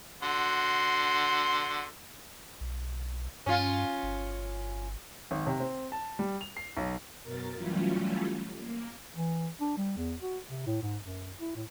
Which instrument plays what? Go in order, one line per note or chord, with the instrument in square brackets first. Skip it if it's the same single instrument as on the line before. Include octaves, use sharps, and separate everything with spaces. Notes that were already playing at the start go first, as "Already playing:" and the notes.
[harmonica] D3 F#4 C6
[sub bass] B1
[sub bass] G2 [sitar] C#4 F4
[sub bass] G1
[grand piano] G#1
C3
C4
A5
G3
F7
C7
B1
[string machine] F#2 B2 A#4 A6
E3 F#3 G3 A3 C#4 F4
A#3
[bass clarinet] E3
D4
G3
E2
F#4
C3
A2
G#2
F#2
E4
A2